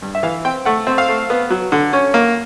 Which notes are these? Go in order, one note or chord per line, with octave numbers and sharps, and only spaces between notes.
G2
E5
E3 F5
C4 G5
A3 F#5
C4
F5
A3
B3
F#3
D3
C#4
A#3